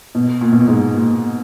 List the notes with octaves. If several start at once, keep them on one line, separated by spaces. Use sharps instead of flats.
B2
A#2
B2
A#2
G#2
A#2